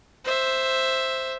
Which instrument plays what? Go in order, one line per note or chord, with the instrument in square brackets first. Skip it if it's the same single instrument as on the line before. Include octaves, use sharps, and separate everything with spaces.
[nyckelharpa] C5 E5